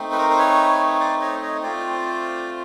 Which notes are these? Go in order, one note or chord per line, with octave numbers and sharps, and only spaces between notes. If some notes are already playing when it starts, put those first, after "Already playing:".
Already playing: A3 C4 D#4
B4
A#4 C5
C5
B4 C#5
C5 D5
C#5 D#5
C#5 D#5
A3 C4 F4 C5 D5